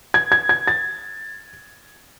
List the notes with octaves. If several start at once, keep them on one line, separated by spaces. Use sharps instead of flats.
G#6
G#6
G#6
A6